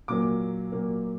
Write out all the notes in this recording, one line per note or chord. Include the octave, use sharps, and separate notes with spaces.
A#2 F#3 A#3 D6
A#2 F#3 A#3